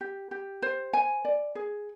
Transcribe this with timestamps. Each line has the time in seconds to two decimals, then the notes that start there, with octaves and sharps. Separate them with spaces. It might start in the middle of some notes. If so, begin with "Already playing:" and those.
0.01 G4
0.31 G4
0.62 C5
0.93 G#5
1.25 D5
1.55 G#4